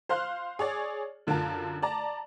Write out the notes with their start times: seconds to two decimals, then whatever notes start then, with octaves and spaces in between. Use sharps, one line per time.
0.09 C5 F5 C6 F6 F#6
0.59 G#4 C#5 D5
1.27 F#2 D3 F4 A#4 A5
1.82 D5 A5 A#5